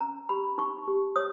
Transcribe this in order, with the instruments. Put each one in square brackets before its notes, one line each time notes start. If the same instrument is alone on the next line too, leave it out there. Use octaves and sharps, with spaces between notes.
[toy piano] C#4 A#5
G4 B5
D#4 C#6
G4
C#5 D#6